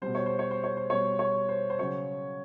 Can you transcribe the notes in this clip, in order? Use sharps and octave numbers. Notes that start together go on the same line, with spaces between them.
B2 G3 C5
C#5
C5
C#5
C5
C#5
C5
B2 G3 C#5
C#5
C5
C5
C#3 F#3 C#5